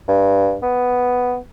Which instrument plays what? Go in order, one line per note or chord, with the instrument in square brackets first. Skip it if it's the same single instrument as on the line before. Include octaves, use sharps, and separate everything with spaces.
[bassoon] G2
B3